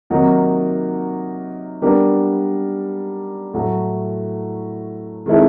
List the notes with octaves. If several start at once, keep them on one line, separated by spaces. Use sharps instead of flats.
C3 D#3 F#3 A#3 D#4
G3 B3 D4 G4 A#4
A2 F#3 A3
D#3 G#3 C4 E4 A4